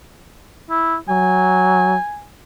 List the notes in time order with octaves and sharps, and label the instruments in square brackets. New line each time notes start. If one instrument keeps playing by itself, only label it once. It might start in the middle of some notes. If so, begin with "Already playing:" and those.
[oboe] E4
[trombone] F#3 [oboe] G#5